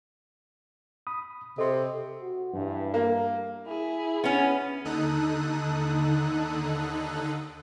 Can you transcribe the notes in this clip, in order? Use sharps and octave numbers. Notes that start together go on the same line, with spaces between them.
B5 D#6
C3 A4 D#5 C6
F#4
G2 E3
A#3 A#4
E4 G#4
B3 C#4
D#2 D3 D#4 A4 D#6 F#6